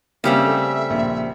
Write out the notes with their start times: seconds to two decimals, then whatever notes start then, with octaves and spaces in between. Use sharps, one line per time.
0.24 C#3 G3 A#3 C4 C#4 G4 E5
0.45 A3
0.90 A#1